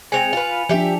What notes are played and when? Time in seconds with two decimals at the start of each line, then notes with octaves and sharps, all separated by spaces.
0.12 G#3 C4 G5 G#5 C#7 F7
0.33 F4 B4
0.69 F3 D4 G4 E5 G5